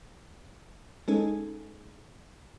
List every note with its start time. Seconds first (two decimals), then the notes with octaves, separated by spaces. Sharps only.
1.08 G#3 C#4 D#4 G#4 A4